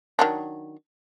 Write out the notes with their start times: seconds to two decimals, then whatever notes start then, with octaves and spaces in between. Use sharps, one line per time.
0.19 D#3 F#3 D4